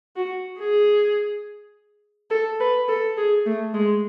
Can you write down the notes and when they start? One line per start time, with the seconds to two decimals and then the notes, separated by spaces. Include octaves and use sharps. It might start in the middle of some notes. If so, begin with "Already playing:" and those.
0.16 F#4
0.60 G#4
2.31 A4
2.60 B4
2.88 A4
3.17 G#4
3.46 A3
3.74 G#3